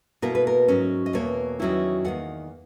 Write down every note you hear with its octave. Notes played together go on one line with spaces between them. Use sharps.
B2 A#3 E4 A#4
B4
A#4
G#2 F#3 C#4
D#5
E2 B2 A#3 C#5
E2 D#3 F#3 C#4 E4
E2 D#3 A#3 F#5